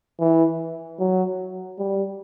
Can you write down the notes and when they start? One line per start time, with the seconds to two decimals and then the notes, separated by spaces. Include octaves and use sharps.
0.19 E3
0.99 F#3
1.78 G3